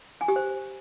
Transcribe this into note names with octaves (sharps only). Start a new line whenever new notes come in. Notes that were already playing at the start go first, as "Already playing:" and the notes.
G#5
G4
C5